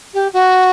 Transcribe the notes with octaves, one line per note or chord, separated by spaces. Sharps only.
G4
F#4